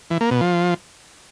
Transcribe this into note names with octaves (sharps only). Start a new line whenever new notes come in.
E3
A#3
B2
F3